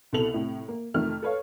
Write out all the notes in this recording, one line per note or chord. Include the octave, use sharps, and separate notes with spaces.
C2 B2 A4 F7 F#7
A2 C3
A#3
F2 C3 D#3 A3 F6
A4 B4 C#5 F5